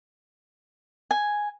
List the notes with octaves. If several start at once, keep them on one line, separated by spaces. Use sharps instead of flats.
G#5